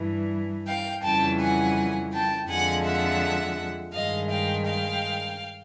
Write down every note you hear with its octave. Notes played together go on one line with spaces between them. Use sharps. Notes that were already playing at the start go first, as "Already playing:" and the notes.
Already playing: G2 E3 G3
F5 G5
F2 C#3 E3 G3 G5 A5
F#5 G#5
G5 A5
F2 D3 F3 G#3 F#5 G#5
E5 F#5
G2 D#3 G#3 D#5 F5
F5 G5
F5 G5